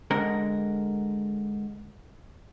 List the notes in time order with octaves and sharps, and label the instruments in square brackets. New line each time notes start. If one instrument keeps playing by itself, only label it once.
[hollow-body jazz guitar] D3 G#3 A#4